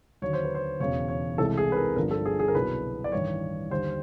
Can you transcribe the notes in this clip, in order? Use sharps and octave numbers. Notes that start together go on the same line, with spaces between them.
D#2 D3 F#3 C#5
C5
B4
C5
E1 E2 C#3 F#3 C#5
C#5
C2 C3 E3 G#3 A4
G#4
B4
A#4
G1 G2 D3 F3 A#4
A4
G#4
G#4
A#4
C2 B2 F#3 B4
D5
A1 G2 D#3 C#5
D#2 D3 G3 C5